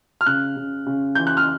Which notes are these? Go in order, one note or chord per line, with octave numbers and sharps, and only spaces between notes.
F6
C#3 F#6
C#3
C#3
E3 G6
F#6
F6